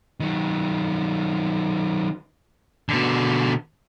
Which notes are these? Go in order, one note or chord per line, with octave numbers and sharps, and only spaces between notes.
D#3 F#3
B2 D3